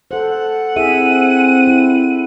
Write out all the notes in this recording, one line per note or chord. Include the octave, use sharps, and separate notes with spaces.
A4 C5 F#5
C4 E4 G#4 E5 D#7
E4